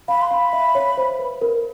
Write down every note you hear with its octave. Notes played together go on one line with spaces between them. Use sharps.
F5 B5
C6
F5 B5
E5
C#5
C5
B4
A#4